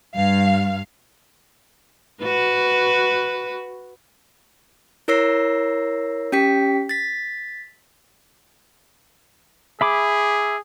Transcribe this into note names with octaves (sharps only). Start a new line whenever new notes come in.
G2 F5
F#4 B4
E4 A#4 C#5 E6 A#6 C7
C#4 G4 G5 B6
A6 B6
G#4 E5 B5 D6